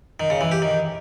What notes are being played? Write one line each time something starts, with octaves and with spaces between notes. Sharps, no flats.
D#3
C#3
E3
G4
D#3